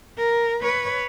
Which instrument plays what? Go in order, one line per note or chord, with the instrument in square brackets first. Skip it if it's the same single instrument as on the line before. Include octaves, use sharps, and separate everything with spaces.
[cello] A#4
B4 C#5